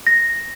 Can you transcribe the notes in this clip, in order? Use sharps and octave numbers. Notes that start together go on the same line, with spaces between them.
A#6